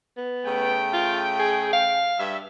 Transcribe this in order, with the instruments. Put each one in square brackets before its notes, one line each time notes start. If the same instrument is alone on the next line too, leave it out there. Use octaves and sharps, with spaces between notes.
[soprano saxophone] B3
[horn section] C#3 A3 G5
[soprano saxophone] F4
G#4
F5
[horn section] G2 G3 E5